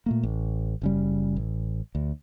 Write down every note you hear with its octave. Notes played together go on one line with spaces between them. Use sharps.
A#2 A3 A#3
A1
F#1 C#3 G3
A1
D2